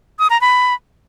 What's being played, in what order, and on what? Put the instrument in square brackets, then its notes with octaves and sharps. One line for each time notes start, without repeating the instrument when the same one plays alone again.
[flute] D#6
A#5
B5